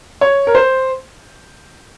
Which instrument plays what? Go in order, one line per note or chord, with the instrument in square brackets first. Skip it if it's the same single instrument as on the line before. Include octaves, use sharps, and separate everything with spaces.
[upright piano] C#5
A#4
C5